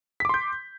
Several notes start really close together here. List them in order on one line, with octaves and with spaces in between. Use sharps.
B6 D6 C6 G6